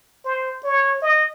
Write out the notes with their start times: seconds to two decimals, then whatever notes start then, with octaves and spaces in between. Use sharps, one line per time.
0.24 C5
0.64 C#5
1.02 D#5